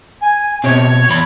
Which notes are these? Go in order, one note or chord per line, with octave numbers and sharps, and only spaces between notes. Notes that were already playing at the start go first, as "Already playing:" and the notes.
G#5
B2 C4 C#5
E2 B5